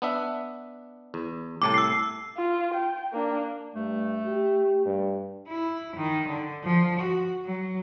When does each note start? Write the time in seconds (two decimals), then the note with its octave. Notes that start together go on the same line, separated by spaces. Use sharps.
0.02 B3 D4 E5
1.14 E2
1.62 C2 A2 A5 D6
1.74 E6 C7
2.37 F4
2.74 G5
3.12 A#3 D4
3.76 G2 A3
4.26 G4
4.85 G2
5.48 E4
5.96 D#3
6.28 D3
6.64 F3
6.99 F#4
7.46 F#3